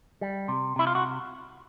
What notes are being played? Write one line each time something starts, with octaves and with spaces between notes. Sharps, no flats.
G3
C3
C3 E4
F4
F#4